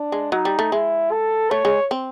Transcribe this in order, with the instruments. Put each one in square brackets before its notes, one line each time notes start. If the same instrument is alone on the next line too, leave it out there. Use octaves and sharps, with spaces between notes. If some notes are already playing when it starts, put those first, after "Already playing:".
Already playing: [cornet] D4
[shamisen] G#3
[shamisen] F#3 [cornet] D#4
[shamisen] G3
A3
[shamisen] G#3 [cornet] E4
[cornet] A4
[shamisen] A3 [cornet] C#5
[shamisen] G#3
C4